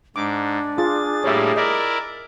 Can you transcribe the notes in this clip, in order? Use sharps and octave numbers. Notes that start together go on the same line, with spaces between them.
G#2 D4 D6
F4 G#4 A6
A2 G3 A#3 C#5 E5
E4 A#4 D5 D#5